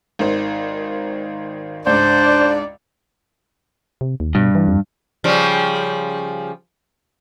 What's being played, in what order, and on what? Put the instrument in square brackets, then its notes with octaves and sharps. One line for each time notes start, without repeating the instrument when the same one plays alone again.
[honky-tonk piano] G#1 D#3 C5
[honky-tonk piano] C#2 G#2 [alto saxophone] D4 [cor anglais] C5 [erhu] D5
[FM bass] C3
D#2
[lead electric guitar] G2 [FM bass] B2
[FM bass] E3
F2
[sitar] C#3 F3 G3